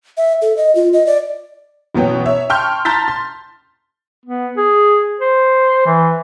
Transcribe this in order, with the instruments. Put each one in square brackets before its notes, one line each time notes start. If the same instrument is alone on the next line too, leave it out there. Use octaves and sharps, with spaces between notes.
[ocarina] E5
A4
D#5
F4
D#5
D5
[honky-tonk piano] A1 B2 F#3 B3 C#5 G5
C#5 E5
G5 A5 C6 C#6 F6 G6
A5 A#5 C6 G6 A6 B6
C6
[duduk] B3
G#4
C5
E3